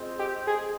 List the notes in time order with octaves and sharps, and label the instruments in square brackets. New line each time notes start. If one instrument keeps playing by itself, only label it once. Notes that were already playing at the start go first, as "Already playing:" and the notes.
Already playing: [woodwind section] G#3 C4 F4 C5 D#5
[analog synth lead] G4
G#4